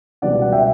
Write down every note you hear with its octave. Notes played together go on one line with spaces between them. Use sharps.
C#2 B2 G3 D5 F#5
F#5
E5 G5